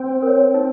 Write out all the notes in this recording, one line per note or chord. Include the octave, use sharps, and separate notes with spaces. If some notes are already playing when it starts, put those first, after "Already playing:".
Already playing: C4
A#4
C#5
D#4